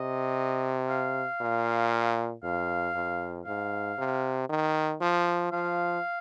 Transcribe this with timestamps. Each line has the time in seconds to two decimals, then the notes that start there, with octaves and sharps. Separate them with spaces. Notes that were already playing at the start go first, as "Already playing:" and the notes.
Already playing: C3 D#5
0.89 F5
1.41 A#2
2.43 F2 F5
2.95 F2
3.46 G#2 F5
3.98 C3
4.49 D#3
5.01 F3
5.52 F3 F5